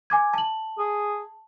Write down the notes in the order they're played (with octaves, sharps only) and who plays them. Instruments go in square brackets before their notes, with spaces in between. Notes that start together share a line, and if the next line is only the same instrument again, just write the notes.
[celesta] G#5 D6 G#6
A5 F#7
[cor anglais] G#4